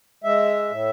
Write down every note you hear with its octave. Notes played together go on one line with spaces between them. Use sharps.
G#3 E5
A2